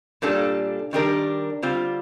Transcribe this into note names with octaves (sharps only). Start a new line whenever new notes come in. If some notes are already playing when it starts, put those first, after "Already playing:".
A#2 G3 A#3 D4 A4
D#3 G3 D4 G4 A#4
D3 G3 C4 F4